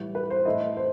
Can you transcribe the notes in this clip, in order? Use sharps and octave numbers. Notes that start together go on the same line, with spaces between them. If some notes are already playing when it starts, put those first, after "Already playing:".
Already playing: A2 E3 G3
B4
C5
A2 E3 A3 E4 D#5
C5